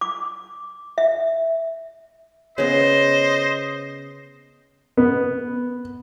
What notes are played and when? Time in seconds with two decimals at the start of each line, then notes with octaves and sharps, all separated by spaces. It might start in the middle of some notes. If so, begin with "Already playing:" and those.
0.01 D6
0.98 E5
2.58 C#3 B3 C5 C#5 D#5
4.97 B3